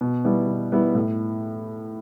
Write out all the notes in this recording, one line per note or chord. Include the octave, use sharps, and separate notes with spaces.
B2
G3 B3 E4
B2
G3 B3 E4
A2